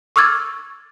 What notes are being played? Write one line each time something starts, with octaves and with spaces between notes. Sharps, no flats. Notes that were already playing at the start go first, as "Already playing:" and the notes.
C#6 D6 E6 F6 G#6 A6